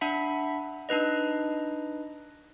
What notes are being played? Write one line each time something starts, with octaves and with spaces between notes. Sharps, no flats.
D4 E5 F#5 B5 B6
D4 D#4 B4 D#5